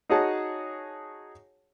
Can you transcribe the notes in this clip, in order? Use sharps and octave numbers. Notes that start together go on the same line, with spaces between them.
D#4 F#4 G#4 C#5 F#5 A5